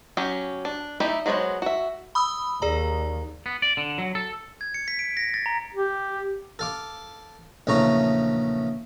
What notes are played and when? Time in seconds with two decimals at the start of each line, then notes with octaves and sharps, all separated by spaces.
0.17 F#3 C#4 G4
0.65 D4
1.00 G3 A3 D#4 E4 G4
1.26 F#3 G#3 B3 C5 C#5
1.62 F#4 E5
2.15 B5 D#6 E6
2.62 D#2 G#4 D5 A#5
3.46 B3
3.62 D5
3.77 D3
3.98 F#3
4.15 A4
4.61 G#6
4.74 C#7
4.88 B6
4.99 D7
5.17 A#6
5.34 A6
5.46 A#5
5.74 G4
6.59 A4 F5 D6
7.67 A#1 E2 C#3 A3 A#5 C#6